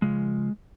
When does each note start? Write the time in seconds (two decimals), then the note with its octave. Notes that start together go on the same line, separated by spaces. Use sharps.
0.02 C#3 F3 G#3